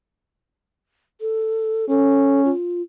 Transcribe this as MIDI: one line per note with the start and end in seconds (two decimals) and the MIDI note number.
1.21 1.85 69
1.89 2.51 61
1.89 2.43 69
2.45 2.82 65